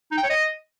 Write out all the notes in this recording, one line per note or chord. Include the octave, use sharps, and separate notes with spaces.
D#4
G5
C#5
D#5